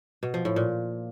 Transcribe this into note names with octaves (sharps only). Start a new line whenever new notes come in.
B2
F3
A2
A#2